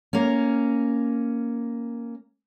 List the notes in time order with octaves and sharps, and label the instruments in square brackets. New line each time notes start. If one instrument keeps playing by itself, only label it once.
[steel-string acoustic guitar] A#3 C#4